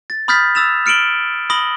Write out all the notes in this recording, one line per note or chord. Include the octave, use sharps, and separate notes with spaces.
A6
B5 D#6 F6 G6 A6 B6
D#6 E6 A6 E7 F7
F6 C#7 D7 E7 F#7 G7
B5 D#6 A#6 F#7 G7